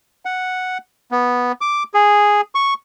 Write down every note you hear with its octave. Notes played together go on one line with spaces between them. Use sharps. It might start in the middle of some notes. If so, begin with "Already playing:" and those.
F#5
B3
D6
G#4
C#6